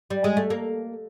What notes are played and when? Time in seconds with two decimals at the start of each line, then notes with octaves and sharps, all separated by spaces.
0.10 G3
0.24 G#3
0.37 A3
0.50 A#3